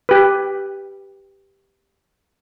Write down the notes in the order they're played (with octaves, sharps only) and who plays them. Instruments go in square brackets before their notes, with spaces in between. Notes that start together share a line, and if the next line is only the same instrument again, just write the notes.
[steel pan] G4 B4